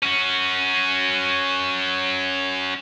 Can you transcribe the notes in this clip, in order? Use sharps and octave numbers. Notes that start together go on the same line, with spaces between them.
C#4 F#4